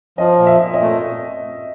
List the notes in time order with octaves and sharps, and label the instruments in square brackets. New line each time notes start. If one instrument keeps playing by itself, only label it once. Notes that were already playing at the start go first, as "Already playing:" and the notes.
[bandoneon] F3 [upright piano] D#5
[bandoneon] A#2
[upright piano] E5
[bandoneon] A#2
[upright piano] D#5
[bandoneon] A3